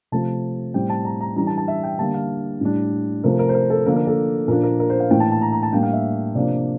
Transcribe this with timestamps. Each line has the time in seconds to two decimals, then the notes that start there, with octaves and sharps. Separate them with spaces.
0.12 C3 F3 A3 A5
0.74 A2 G3 C4 G5
0.90 A5
1.05 A#5
1.21 A#5
1.36 E3 G3 D4 A#5
1.47 A5
1.58 A5
1.68 E5
1.83 G5
1.99 D3 G3 A#3 A5
2.14 F5
2.61 A2 G3 D4
3.24 C3 F3 A3 A#4
3.39 A#4
3.49 C5
3.55 A#4
3.70 A4
3.86 D3 F3 A#3 D4 A#4
3.96 A#4
4.07 A4
4.48 A#2 F3 A#3 D4 A#4
4.63 A#4
4.80 A#4
4.90 C5
5.00 F5
5.11 A2 E3 A#3 D4 G5
5.20 A5
5.32 A5
5.42 A#5
5.52 A#5
5.63 A5
5.73 A2 G3 A#3 D4 G5
5.83 F5
5.93 E5
6.35 C3 F3 A#3 D4 D5